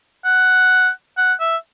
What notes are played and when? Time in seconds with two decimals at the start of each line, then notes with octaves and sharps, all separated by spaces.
0.25 F#5
1.17 F#5
1.40 E5